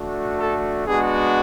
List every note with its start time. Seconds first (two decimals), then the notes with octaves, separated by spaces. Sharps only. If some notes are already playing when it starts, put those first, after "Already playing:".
Already playing: A3 D4 F#4
0.38 A4
0.86 G#3 B3 D4 F#4 G#4